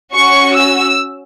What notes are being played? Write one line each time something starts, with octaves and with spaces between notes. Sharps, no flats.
C#4 F#4 C#6
E6